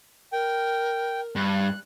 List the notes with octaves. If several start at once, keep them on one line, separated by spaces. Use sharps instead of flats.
A#4 G5
G2 F#6